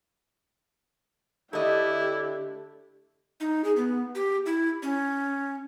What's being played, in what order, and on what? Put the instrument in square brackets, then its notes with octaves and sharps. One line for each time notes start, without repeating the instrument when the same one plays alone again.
[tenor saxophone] D3 [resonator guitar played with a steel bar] A3 D#5 [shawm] E4 [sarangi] G4
[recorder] D#4
G#4
B3
G4
E4
C#4